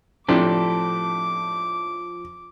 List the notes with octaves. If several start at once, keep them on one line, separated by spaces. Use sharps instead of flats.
A2 F3 C4 D4 G4 A4 D5 D6